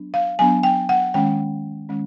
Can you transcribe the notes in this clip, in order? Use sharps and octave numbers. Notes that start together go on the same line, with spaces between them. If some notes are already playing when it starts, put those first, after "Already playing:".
Already playing: F#3 B3 D4
F5
F#3 B3 D4 G#5
G5
F#5
D#3 G#3 C#4 G5
D#3 G#3 C#4